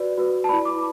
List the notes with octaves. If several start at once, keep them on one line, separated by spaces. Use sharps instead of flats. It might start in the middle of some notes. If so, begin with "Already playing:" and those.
Already playing: F#4 B4 D5
F#4 B4 D5
A5
E4 B4 D5 B5
D6